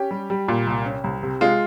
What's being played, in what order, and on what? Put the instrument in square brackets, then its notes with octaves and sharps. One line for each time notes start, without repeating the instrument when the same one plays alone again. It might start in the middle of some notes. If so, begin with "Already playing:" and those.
Already playing: [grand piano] C#4 G4
G3
G3
A#2
C2
C#4
C2
C3
G#3 F4